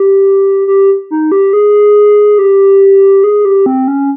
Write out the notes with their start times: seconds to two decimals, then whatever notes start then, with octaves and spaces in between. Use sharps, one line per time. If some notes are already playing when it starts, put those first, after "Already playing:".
Already playing: G4
0.68 G4
1.11 D#4
1.32 G4
1.53 G#4
2.38 G4
3.24 G#4
3.45 G4
3.66 C4
3.88 C#4